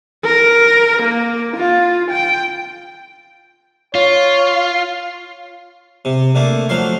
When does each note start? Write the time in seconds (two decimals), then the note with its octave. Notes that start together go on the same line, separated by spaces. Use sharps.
0.25 A#4
1.02 A#3
1.56 F4
2.10 G5
3.95 F4 C#5
6.05 C3
6.35 D3 A3 A#3
6.69 D2 F3 F#3 F5 C6